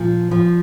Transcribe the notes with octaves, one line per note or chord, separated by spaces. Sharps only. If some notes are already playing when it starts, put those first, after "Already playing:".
Already playing: A#2 F3
F3